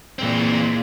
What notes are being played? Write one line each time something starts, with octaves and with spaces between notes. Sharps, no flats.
A#2 E3 G#3 C4